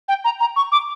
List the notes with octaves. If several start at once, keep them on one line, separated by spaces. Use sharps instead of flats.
G5
A#5
A#5
C#6
D6